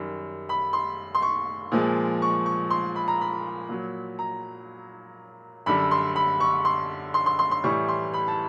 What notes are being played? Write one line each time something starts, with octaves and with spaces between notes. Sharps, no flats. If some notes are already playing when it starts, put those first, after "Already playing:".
Already playing: F#2 D#3 G3
B5
C6
C6
C#6
A#2 F3 G#3
C#6
C#6
C6
B5
A#5
B5
A#2 F#3
A#5
F#2 D3 G3 B5
C6
B5
C#6
C6
C6
C6
C6
C6
A2 E3 G3 C#6
C6
B5
A5